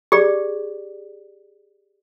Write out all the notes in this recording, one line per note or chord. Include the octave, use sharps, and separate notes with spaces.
G4 G#4 D5